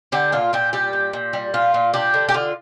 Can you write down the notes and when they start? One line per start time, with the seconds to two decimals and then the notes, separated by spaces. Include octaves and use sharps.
0.12 D3 G4
0.32 A#2 F4
0.53 A#2 G4
0.73 G3 G4
0.93 A#2
1.13 A#2
1.33 G3
1.54 A#2 F4
1.74 A#2
1.94 D4 G4
2.14 D3
2.29 G4
2.34 D3 F4